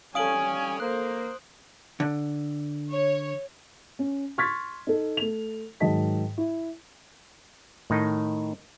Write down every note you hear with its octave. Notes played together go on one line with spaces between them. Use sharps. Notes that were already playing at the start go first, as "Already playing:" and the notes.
G3 C#4 A4 F5 G#5 D#6 D7 F#7
A#3 C5 F#6
D3
C#5
C#4
C6 C#6 F6 G#6 A6 B6
D#4 A4
A3 F7
G#2 D#3 F#3 D#5 A5 B6
E4
A2 D#3 D#4